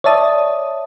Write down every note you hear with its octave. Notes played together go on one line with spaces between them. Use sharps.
C#5 D5 E5 A5 D#6